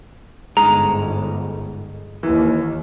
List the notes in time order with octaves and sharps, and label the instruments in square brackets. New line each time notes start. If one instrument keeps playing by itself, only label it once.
[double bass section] G1 G#2 [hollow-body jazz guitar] G#3 D#4 [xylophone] A#5
[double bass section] D#2 [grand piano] E3